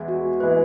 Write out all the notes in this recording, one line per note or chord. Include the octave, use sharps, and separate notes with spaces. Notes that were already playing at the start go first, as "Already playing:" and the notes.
Already playing: E2 E3 G#3 E4
F#4
E3 G#3 E4 B4